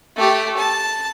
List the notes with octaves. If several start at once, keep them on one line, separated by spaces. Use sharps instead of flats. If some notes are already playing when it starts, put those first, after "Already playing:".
A3 G4
A5